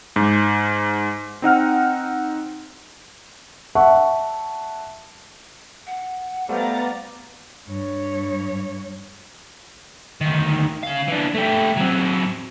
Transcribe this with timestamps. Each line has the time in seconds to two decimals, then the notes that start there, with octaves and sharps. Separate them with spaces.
0.16 G#2
1.42 C4 D#4 F#5 F6
3.75 E5 F#5 A5 C#6
5.86 F#5
6.49 G3 A3 B3 C5 D5 F5 A#5 A6
7.68 G2 C#5
10.21 D2 D#3
10.83 C#3 F5
11.08 E3 D4
11.35 A3 G4
11.77 F#3 C4